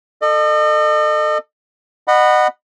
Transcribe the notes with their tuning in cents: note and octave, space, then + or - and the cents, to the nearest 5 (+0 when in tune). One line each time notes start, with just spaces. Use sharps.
A4 +10 D#5 -40
D#5 -30 F#5 +0 B5 +0